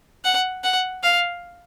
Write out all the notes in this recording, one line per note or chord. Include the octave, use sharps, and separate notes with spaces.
F#5
F#5
F5